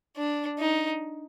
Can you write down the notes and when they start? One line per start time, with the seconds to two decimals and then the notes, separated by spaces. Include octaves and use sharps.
0.17 D4
0.59 D#4